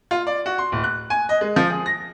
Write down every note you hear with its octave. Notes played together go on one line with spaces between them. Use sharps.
F4
D5
F#4
C6
D1
F#6
G#5
D#5
G#3
F3
G#4
A#6